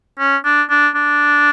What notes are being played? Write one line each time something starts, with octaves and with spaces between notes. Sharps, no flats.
C#4
D4
D4
D4